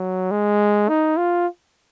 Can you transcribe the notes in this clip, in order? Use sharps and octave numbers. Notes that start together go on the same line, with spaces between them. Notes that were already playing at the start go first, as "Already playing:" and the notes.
Already playing: F#3
G#3
D#4
F4